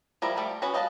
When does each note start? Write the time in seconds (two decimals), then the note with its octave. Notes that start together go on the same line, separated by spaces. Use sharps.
0.22 F3 G3 E4 A#4
0.36 F3 G3 A3 D5
0.62 B3 C#4 F#4 B4
0.74 G3 D#5 F5 G5 A5